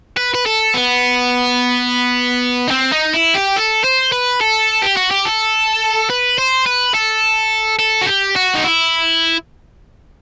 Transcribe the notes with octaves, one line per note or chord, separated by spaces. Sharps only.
B4
B4
A4
B3
D#4
C4
D#4
E4
G4
A4
C5
B4
A4
G4
F#4
G4
A4
B4
C5
B4
A4
A4
F#4
G4
F#4
D#4
E4